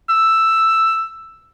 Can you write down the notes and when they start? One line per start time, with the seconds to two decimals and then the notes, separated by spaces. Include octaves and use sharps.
0.09 E6